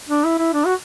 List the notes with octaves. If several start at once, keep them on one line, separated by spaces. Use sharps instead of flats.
D4
E4
E4
D4
F#4